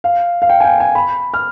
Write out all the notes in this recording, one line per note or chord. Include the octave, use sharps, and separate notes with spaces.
F5
F5
G5
G#5
G5
G#5
B5
F6